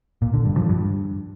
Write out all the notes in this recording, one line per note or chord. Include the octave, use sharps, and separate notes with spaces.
A#2
D3
G2
F3
G2